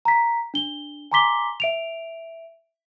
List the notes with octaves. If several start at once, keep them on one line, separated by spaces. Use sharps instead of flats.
A#5 B6
D4 G7
G#5 A#5 C6 D6 B6 G7
E5 D7 F7